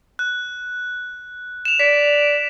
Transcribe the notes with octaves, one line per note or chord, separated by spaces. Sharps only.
F#6
E7 F7
D5 B6